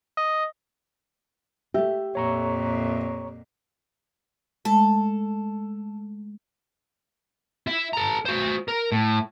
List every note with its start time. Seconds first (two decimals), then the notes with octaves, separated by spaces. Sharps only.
0.17 D#5
1.74 A3 G4 E5
2.15 F2 A#2 C#5 A#5 C#6
4.65 G#3 A3 A4
7.67 E4 E5
7.93 A4 A#5
8.25 F#4 C5
8.68 A#4
8.92 A2